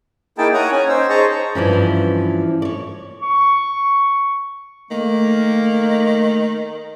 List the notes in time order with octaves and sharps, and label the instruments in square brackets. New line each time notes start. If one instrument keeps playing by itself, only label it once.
[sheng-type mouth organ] A#3 D#4 E4 G#4 G5 A5
C#5 F#5 G#5 A#5 D#6
C#4 G#5
D#4 C5 E6
G#4 C5 D#5 A5 A#5 C#6
[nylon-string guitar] G2 E3 F3 C#4
C#5 D5
[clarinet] C#6
[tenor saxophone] D#3 [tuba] A3 [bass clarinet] A#3